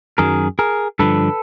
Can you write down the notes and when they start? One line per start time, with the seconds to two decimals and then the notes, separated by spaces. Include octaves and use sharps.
0.18 F#2 D#3 F#3 G#4 A#4
0.59 G#4 A#4
0.99 G2 D3 F3 A4 B4